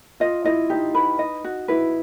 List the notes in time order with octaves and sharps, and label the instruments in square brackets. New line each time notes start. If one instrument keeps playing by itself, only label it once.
[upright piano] F4 [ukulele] D#5
[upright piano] E4 [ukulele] D#5
[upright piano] D#4 [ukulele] G4
[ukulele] B4
D#5
F#4
[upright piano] E4 [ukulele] B4